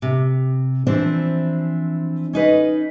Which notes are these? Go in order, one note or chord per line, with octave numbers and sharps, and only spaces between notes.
C3
E3 F3 C4 D4 E4
C#4 D#4 B4 D#5